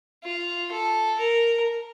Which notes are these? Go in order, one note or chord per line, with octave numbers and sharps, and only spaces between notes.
F4
A4
A#4